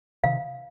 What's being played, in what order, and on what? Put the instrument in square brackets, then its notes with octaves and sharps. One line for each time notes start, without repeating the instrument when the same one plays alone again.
[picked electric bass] C3 D#3 [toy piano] F5